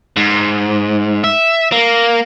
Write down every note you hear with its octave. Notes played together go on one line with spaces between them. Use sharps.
G#2
E5
A#3